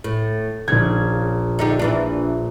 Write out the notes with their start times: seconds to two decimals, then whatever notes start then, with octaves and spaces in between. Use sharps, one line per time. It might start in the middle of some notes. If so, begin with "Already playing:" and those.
0.04 A2
0.68 A#1 C#3 G#6
1.59 D3 D#4 G4
1.79 A#2 E3 D4